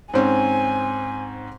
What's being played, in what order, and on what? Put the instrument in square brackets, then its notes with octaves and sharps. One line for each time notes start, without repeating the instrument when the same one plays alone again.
[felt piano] G#2 C4 C#4 [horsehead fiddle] G#5